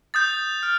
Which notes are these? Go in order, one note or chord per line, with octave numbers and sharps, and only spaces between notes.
D#6 G6 A6
F6